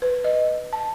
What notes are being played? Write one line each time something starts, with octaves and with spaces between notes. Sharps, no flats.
B4
D#5
A5